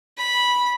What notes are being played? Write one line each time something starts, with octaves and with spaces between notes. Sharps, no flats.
B5